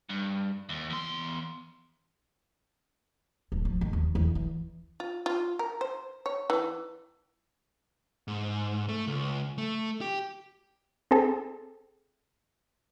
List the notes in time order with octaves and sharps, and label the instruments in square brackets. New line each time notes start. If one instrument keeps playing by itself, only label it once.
[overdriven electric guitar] G2
D#2
E2 C6
[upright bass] D1
F3
D#3
D#2
E2
E3
[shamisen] F4
F4
A#4
C5
C#5
E3
[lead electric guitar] G#2
A3
C#2
A3
G4
[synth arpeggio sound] C4 G#4 A4